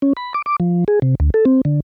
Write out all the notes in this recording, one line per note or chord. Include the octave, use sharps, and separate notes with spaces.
C#4
B5
D6
D6
F3
G#4
C3
D2
A4
C4
D3